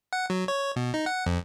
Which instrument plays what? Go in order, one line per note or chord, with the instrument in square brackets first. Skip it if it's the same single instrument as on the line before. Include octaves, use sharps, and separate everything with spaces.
[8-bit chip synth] F#5
F#3
C#5
B2
D#4
F#5
F2